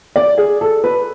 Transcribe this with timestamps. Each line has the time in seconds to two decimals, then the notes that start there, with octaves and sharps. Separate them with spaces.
0.16 D5
0.38 G#4
0.61 A4
0.84 B4